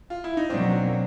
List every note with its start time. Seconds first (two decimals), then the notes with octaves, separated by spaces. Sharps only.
0.10 F4
0.24 E4
0.37 D#4
0.49 B2 F#3 A#3 C4 D4